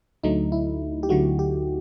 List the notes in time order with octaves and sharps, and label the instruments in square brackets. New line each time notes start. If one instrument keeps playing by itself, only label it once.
[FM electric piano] D2 D3 F#3 A3 D#4
E4
G4
D2 D3 F#3 A3 F#4
G4